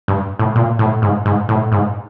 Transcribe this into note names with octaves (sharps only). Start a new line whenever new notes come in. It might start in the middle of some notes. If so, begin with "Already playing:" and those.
G2
A2
A#2
A2
G#2
G#2
A2
G#2